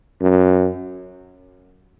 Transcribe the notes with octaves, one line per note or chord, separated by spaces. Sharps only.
F#2